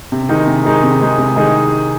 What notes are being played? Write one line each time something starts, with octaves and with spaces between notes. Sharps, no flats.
C3
D#3 G#3 D#4 G#4
C3
D#3 G#3 D#4 G#4
C3
D#3 G#3 D#4 G#4
C3
D#3 G#3 D#4 G#4